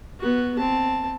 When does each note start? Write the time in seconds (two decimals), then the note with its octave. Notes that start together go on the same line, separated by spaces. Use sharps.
0.20 B3 F#4
0.59 C4 A5